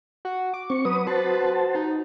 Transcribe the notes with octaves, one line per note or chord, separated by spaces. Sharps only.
F#4
D6
C4 C#6
F#3 B4 D#6
F#4 B4 C5 A5
D#4